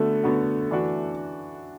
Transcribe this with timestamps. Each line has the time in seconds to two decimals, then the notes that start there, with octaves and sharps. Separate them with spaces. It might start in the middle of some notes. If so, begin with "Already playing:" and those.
Already playing: D3 A3 B3 F#4
0.24 D3 B3 F#4
0.71 E3 D4 F#4